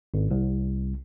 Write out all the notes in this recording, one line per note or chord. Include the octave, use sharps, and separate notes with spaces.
G#1
C2